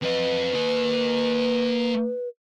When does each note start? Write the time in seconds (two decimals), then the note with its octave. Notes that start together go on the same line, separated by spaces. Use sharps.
0.02 F2 B4 D#5
0.54 A#3 D#5